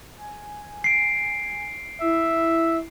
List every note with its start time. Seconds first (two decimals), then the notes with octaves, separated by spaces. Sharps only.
0.18 G#5
0.84 C7 D7
2.01 E4 E5